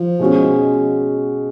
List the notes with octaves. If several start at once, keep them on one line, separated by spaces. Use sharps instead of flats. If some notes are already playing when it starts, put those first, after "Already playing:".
Already playing: F3
B2 G#3 C#4 F#4